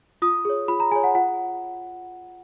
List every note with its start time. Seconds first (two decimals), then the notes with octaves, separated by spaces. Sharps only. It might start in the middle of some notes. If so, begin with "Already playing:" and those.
0.22 F4 D#6
0.45 G#4 C#5
0.68 F4 B5
0.80 A#5
0.92 G#4 C#5 G#5
1.04 F#5
1.15 F4 F#5